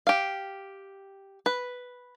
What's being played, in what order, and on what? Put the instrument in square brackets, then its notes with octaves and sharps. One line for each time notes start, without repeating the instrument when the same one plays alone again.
[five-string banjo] G4 F5
B4